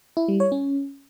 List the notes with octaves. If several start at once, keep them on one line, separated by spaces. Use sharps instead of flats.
E4
G3
C#5
C#4